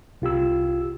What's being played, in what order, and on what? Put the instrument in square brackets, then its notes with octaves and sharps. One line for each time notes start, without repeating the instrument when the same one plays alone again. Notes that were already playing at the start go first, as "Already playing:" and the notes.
[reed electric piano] C2 F4 G4 E6